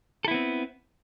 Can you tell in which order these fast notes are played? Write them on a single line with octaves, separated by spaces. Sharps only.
A4 E4 B3 C4